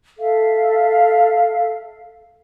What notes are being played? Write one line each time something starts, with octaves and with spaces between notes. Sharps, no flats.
A4 E5 F5